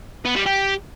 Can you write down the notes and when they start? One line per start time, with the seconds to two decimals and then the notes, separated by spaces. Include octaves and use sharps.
0.25 B3
0.35 G3
0.46 G4